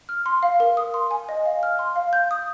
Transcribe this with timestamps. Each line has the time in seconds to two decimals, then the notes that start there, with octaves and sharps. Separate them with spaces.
0.09 F6
0.26 C6
0.43 F5
0.60 A#4
0.77 D#6
0.94 C6
1.11 G#5
1.29 D#5
1.46 F5
1.63 F6
1.79 C6
1.96 F5
2.13 G6
2.31 D#6